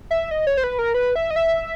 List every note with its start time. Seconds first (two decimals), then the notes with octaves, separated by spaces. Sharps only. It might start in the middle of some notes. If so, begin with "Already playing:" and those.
0.11 E5
0.31 D#5
0.47 C#5
0.57 C5
0.64 B4
0.79 A#4
0.94 B4
1.16 E5
1.31 D#5
1.36 E5